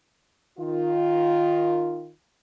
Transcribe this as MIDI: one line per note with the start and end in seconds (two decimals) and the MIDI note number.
0.58 2.10 51
0.58 2.10 65